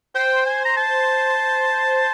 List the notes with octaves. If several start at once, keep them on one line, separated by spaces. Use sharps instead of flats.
C5 G5
G#5
A#5
A5